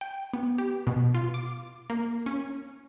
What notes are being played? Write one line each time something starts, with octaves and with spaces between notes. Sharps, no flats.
G5
B3
G4
B2
F4
D6
A#3
C#4